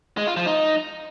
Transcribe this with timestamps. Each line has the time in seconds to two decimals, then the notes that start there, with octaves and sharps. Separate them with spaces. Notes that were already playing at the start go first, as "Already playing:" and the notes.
0.17 G#3
0.27 F4
0.37 F3
0.46 D#4